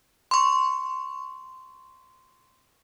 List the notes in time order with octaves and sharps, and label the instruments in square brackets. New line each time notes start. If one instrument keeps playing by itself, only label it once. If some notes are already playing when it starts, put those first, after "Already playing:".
[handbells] C6 C#6